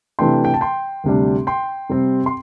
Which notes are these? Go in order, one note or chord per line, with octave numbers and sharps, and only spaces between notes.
C3 E3 A3 D4 G5 C6
G5
A5
G5 C6
D2 C3 G3 D4
G5 C6
C3 G3 C4
C6